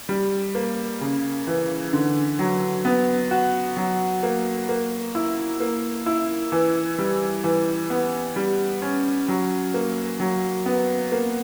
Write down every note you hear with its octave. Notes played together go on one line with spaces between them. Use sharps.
G3
A#3
C#3
E3
D3
F#3
B3
F#4
F#3
A#3
A#3
E4
A#3
E4
E3
G3
E3
B3
G3
C#4
F#3
A#3
F#3
B3
A#3